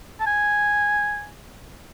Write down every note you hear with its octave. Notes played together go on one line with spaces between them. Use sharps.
A5
G#5